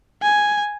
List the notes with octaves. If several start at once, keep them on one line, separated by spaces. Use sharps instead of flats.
G#5